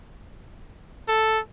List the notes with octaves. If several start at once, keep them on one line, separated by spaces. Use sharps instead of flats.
A4